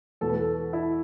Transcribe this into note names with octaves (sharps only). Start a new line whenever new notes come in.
E2 B2 A4
B4
A4
E4